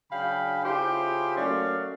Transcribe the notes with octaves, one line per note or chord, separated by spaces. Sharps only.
C#3 F#3 D4 F5 G5 B5
C#3 E4 F4 G4 C5
F#3 A3 A#3 C#4 D5 F5